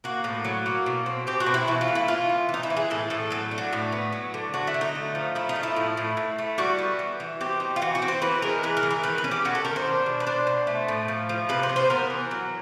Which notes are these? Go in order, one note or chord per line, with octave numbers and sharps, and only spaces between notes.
A#3 F#4
A2 F#4
F#3
A#3
B2
C4
C4 G4
F#4
B2
E4
E3 E4
F4
A3
E4
E3 F4
E3
E3
D#4
E4
E3
G#4
A2 A4
A2 A4
F#3 A4
D4
F#4
A2
B3
F#3
D3
F#3 F#4
E4
D3
D#4
A3
F3
A3 E4
D#4
F3
E4
A2
A2
A2
A3
G3 F#4
B3
E3
E3
C4 G4
D#4
F4
E3 F#4
F#4
C4
C5
E3 B4
G#3 A#4
E3 B4
A#4
E3
A#4
D#3 B4
B4
C#4
G4
D#3 F#4
A4
D#3 A#4
C5
D4
B2
B4
D4 C5
B2
A3
A2
F3
F3
C3 B4
C5
B3
C5
B3 A#4
E3
F#3